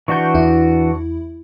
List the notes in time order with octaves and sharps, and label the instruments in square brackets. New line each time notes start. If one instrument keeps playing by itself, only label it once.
[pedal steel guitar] E3 D4 F#4 [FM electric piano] C#6 G6
[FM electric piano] E2 E4